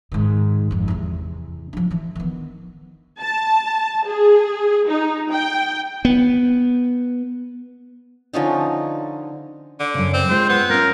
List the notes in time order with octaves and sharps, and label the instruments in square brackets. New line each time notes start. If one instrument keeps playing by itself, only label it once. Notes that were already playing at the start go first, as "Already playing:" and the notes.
[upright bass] G#2 D#3
G#1 F2
E2 C3
F3 D4
E3 F3
D#3 B3
[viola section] A5
G#4
D#4
G5
[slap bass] B3
[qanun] D3 F3 C#4 D#4
[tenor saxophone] D3
[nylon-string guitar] F#2 C#3
[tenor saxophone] C4
[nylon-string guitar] G#3 F4 [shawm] C5
[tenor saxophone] B3
[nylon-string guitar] C#4 F4 [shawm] A#4